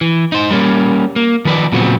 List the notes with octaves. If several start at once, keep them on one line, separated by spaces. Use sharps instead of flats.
E3
D#4 C5
G3 A#3 C#4
A#3
D#3 F3 B4 D5
A#2 C#3 F3 F#3 B3 C4